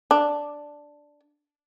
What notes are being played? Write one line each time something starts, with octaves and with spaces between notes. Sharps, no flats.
D4